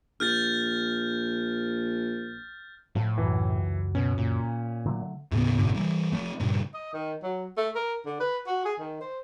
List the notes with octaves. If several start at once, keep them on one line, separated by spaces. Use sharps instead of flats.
A#1 F6 G6 A6
A2 F3 A3
C#2 F#2 E3 F#3
B2 C#4
A#2
D3 F#3 A3
D#2 A2 C#3 B3
F#1 G#2 B2 D3
E3 F3 G3
F3 A3
G2 A#2 C#3
D#5
D#3
F#3
A3
A#4
D3
B4
F#4
G#4
D#3
C5